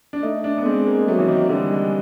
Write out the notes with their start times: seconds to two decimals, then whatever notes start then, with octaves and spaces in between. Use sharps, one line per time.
0.13 D4
0.23 A3 D#4
0.44 D4
0.58 B3
0.65 G#3 C4
0.87 A#3
1.07 F#3 A3
1.19 E3
1.28 D#3
1.49 D3 G3
1.72 G#3